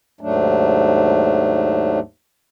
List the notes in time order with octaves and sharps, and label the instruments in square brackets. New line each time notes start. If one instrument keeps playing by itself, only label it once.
[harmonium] D#2 G#2 F#3 A3 D4